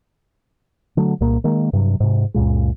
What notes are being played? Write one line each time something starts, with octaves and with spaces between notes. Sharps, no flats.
D3 F#3 A3
C2 A#2 A#3
D#3 G#3 A#3
G2 C3 F#3
G#2 C3
C#2 F#2 A#2 G#3